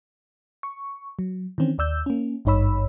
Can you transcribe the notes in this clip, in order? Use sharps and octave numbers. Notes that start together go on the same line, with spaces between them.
C#6
F#3
D#3 E3 C4 C#4
D#2 D5 E6 G6
A#3 C#4
G#1 G2 D#4 C#5 B5 E6